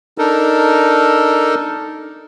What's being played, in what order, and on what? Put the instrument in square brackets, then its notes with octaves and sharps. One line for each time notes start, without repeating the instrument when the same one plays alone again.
[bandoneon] D4 D#4 A4 A#4